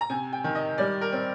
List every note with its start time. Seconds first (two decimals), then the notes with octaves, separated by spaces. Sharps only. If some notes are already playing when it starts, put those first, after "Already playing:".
0.01 A#5
0.10 C3 G#5
0.33 G5
0.44 D#3
0.55 D#5
0.78 G3 D5
1.01 A#4
1.12 C4